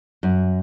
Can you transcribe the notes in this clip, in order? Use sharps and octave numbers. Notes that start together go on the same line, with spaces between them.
F#2